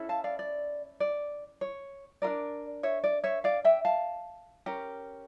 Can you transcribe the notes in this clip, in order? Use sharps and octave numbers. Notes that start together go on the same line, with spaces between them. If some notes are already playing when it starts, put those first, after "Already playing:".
Already playing: C#4 E4 A4
F5 A5
D5 F5
D5
D5
C#5
D4 F4 A#4 D5
C#5 E5
D5
C#5 E5
D5 F5
E5 G5
F5 A5
C#4 G4 A#4